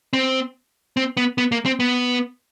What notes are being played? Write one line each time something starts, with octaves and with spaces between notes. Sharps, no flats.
C4
C4
B3
B3
A#3
C4
B3